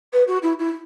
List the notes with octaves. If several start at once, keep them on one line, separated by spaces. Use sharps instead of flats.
B4
F#4
E4
E4